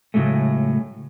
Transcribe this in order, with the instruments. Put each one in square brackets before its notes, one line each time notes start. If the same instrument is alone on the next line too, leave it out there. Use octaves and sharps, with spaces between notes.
[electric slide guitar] A2 C#3 E3 F#3 G#3 A3